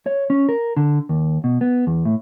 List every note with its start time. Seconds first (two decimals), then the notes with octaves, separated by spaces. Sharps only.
0.06 C#5
0.30 C#4
0.49 A#4
0.77 D3
1.09 D#2
1.44 B2
1.61 B3
1.87 E2
2.05 A2